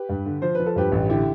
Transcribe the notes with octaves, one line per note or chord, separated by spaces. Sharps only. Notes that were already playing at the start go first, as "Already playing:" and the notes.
Already playing: G4 B4
G2
D3
F3 C5
F3 B4
A4
G2 G4 B4
A1
D3 E4 G4